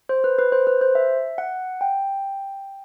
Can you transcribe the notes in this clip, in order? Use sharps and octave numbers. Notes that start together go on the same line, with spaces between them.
C5
B4
B4
C5
B4
C5
E5
F#5
G5